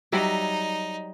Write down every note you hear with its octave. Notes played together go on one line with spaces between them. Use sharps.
F#3 G3 D#4 E5